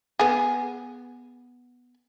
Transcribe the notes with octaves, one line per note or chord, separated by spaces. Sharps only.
B3 G#4